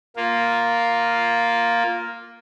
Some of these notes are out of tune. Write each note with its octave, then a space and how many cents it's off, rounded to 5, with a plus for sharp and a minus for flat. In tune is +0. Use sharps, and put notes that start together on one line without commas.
A#3 +0 F4 +0